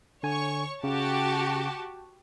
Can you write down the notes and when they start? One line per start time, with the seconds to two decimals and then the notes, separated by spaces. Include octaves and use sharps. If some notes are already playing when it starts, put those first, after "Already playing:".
0.23 D3 C#5 G#5 C#6
0.84 C#3 F#4 G4 A5